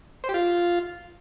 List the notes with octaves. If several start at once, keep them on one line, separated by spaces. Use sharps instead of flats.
C5
G4
F4